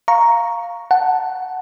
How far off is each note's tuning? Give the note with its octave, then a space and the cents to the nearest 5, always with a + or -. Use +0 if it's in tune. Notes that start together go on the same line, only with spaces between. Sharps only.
F5 +0 A#5 +0 C#6 +0
F#5 +0 A5 +0